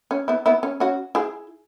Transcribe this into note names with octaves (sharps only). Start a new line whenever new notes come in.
C#4
B3 E4
B3 E4
C#4
C#4 F#4
E4 G#4